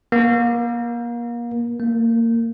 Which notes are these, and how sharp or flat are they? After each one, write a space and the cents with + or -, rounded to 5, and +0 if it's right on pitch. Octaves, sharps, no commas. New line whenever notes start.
A#3 +30
A#3 -25